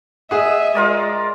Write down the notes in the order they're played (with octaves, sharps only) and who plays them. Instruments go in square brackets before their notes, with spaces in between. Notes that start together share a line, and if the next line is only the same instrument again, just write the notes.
[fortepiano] G#4 F#5 [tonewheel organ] D#5 [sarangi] E5 [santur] D#6
[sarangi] G#3 [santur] F4 A#4 D5